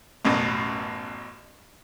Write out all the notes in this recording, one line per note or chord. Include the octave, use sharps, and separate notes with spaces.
A1 F#2 B2